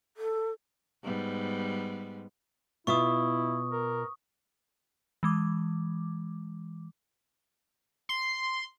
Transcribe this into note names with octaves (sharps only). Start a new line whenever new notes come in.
A4
G#2 G3 B3
B2 E4 F4 E5 C#6 D#6
A#4
E3 G#3 D6
C6